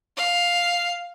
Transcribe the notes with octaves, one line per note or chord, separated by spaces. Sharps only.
F5